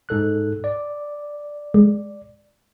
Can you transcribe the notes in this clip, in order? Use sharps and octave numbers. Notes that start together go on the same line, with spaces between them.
G#2 A4 F#6
D5
G#3